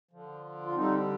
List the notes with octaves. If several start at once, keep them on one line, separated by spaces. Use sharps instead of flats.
D3 F3
F4
D3 G3 C4 D#4